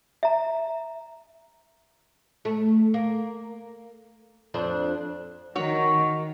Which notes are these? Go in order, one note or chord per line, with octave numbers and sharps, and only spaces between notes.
E5 A#5
A3
A#3
F2 D4 C5
D#3 F#4 C#5